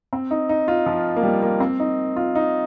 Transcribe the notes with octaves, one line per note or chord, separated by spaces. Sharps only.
C4
D#4
D#4
F4
F3
A#3
G3
A#3
C4
D#4
F4
D#4